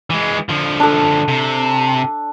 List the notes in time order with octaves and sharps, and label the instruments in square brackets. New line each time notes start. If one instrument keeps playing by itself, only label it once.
[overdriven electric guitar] E3 G#3
D3 F3
[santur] D4 A4
[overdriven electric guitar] C3